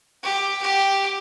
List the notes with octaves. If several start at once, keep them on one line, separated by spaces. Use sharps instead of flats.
G4
G4